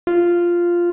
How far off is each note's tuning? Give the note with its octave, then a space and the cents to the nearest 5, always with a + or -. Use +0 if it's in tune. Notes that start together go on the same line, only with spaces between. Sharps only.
F4 -5